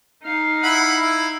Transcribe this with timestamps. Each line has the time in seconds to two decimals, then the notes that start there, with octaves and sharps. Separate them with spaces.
0.23 D#4 F5
0.63 E4 F#5 B5
1.01 E4